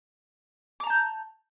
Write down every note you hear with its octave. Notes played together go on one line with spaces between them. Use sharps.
A5 A#5 D6 G6